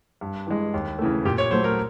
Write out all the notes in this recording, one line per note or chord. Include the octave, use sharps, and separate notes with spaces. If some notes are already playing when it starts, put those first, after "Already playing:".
G2
E3 G#3
D#2
C#3 E3 A3
A#2 G4
C#5
F#3 A3 C5
A#4